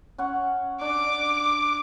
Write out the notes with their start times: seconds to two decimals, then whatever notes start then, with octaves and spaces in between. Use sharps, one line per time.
0.18 C#4 F#5 C#6
0.81 D4 D6